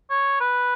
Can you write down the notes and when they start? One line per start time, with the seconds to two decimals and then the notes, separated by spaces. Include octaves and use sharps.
0.10 C#5
0.40 B4